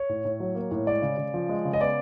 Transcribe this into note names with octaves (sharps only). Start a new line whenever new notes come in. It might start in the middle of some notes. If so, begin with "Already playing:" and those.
Already playing: C#5
A2
A2
F#3
A#3
A2
G#3 D5
C#3
C#3
F3
G#3
C#3
D#5
B3 D5